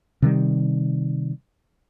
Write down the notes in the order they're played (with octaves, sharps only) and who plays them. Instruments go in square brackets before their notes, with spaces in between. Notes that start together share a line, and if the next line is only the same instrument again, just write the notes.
[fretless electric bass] C3 D#3 G3